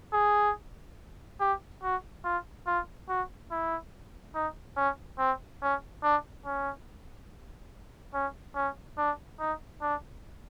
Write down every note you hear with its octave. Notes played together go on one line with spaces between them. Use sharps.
G#4
G4
F#4
F4
F4
F#4
E4
D#4
C#4
C4
C#4
D4
C#4
C#4
C#4
D4
D#4
D4